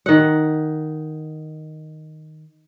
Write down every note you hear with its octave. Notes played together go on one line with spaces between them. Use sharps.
D#3 F#5